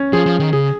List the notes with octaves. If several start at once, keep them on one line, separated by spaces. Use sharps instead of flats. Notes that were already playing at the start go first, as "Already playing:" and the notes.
Already playing: C#4
F3 G#4
F3
D#3
C#3 G#4